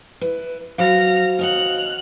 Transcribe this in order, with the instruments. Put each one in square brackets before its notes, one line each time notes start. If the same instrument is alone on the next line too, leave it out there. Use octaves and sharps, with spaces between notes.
[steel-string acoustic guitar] E4 B4
[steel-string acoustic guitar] F#3 [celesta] F#4 C5 F5 [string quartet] F6 A#6
[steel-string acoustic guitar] D#2 D#5 F#5 [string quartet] F6 F#6